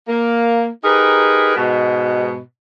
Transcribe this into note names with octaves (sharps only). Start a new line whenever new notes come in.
A#3
D#4 G4 G#4 A#4 B4
G#2 B2